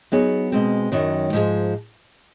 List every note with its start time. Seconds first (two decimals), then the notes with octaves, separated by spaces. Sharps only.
0.12 F#3 B3 D#4 G#4 C#5
0.52 B2 G#3 C4
0.92 F#2 D#3 F#3
1.33 G#2 F3 G#3